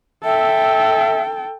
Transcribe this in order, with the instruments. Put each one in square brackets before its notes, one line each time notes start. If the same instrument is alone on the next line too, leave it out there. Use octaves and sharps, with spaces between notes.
[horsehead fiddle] A4 G5 [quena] E5